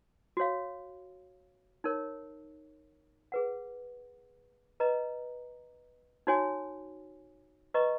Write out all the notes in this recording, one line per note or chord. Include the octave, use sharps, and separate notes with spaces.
F#4 C#5 F5
D#4 A#4 C#5
G#4 B4 F#5
B4 D#5 A#5
D#4 F#4 C#5 G#5
B4 D#5 A#5 C#6